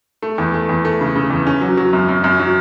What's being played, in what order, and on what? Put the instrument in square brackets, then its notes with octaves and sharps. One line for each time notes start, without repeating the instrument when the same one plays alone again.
[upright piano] A3
E2
A3
E2
A3
C#3
C#3
E2
C#4
F#3
F#3
F#2
F#2
F#2
F#3